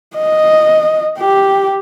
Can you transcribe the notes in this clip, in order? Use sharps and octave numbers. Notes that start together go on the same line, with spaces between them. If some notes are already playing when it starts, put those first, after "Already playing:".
D#5
G4